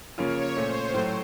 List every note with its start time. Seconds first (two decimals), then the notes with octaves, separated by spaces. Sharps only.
0.18 C#3 F3 A#3 C#4 F4 C#5
0.55 A#2 A3 C#4 C5
0.94 A2 F#3 A3